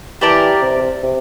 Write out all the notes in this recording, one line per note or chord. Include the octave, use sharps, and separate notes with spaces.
E3 G4 A#4 D5 A5
C3
C3